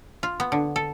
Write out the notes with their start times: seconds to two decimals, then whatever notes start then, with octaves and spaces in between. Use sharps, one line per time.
0.23 F4
0.40 B3
0.52 D3
0.76 A4